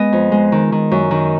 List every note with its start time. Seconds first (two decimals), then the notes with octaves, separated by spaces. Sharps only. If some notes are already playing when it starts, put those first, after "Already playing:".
Already playing: G#3 B3 D#5 G#5
0.13 F2
0.32 G#3
0.52 D#3
0.72 D#3
0.91 F#2
1.11 D#3